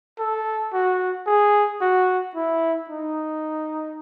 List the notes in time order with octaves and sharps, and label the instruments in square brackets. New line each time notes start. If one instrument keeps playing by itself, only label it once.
[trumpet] A4
F#4
G#4
F#4
E4
D#4